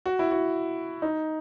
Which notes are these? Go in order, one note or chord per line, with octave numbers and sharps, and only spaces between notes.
F#4
E4
F#4
D#4